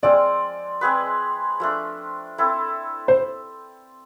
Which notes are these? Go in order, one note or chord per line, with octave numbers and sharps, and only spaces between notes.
F3 G#3 C4 F4 D5
G#3 C4 G#4 B4
F3 A3 D4
C4 E4 A4
C5